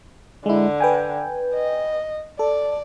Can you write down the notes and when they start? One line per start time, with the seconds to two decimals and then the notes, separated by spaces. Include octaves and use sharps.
0.46 D3 G#3 E4
0.80 B4 G5 G#5
1.54 D#5
2.39 A4 D5